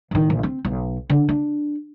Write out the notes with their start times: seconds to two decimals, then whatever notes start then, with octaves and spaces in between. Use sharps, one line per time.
0.11 A1 D#3
0.30 A#1
0.43 C4
0.65 B1
1.10 D3
1.29 D4